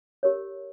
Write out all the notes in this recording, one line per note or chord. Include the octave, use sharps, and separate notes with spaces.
G4 A#4 C#5